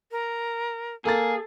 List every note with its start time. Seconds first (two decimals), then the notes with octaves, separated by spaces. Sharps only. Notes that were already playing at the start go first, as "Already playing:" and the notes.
0.11 A#4
1.05 A#3 G#4 A4 A6